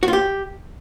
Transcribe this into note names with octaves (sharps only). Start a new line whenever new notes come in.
F#4
F4
G4